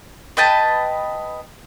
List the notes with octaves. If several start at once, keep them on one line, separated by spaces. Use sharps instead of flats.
B4 D#5 G5 A5